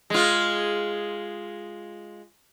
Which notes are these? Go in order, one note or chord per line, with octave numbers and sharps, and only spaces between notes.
G#3 F4